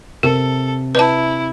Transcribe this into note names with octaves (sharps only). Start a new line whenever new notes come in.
C3 A4 A#4
E4 B4 A5